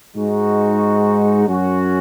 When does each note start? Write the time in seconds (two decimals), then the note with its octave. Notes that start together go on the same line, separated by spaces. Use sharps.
0.16 G#2 G#3 D#4 F#4
1.48 F#2 F#3 C#4 F#4